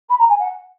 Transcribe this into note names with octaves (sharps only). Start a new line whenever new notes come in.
B5
A#5
G#5
F#5